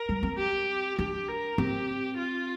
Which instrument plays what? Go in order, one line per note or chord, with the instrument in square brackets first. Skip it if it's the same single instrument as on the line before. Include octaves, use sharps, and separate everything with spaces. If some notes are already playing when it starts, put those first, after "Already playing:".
Already playing: [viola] A#4
[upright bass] G3
C4
[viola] G4
[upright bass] D4 [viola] G4
[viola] A#4
[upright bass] C4 [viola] G4
[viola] F4